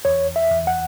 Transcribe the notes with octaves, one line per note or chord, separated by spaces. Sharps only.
E2 C#5
E5
E2
F#5